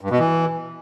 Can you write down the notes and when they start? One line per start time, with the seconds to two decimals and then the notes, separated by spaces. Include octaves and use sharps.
0.01 G2
0.10 B2
0.19 E3